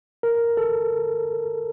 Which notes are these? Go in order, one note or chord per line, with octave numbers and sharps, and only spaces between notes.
A#4
A4